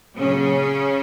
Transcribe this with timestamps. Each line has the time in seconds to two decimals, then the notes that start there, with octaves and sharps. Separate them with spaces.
0.16 A#2 C#3 F#3 C#4